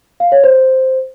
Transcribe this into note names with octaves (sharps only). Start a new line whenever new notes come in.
F5
C#5
C5